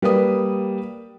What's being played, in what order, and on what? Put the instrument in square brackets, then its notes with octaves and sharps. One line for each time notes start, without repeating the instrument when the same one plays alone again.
[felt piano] G3 A#3 B4 D#6